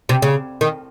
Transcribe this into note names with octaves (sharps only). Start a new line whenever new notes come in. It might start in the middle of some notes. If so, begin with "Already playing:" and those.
C3
C#3
D#3